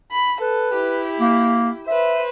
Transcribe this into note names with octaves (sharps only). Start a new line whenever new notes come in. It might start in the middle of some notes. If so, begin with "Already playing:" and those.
B5
A4 B4
E4 G4
A#3
B4 C5 E5